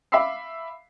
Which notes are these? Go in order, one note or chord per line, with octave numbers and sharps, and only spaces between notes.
E5 F5 B5 D6 E6 C7